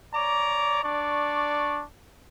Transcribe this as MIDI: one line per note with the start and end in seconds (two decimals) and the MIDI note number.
0.14 0.82 73
0.14 0.82 74
0.14 0.82 82
0.14 0.82 86
0.83 1.84 62
0.83 1.84 74
0.83 1.84 85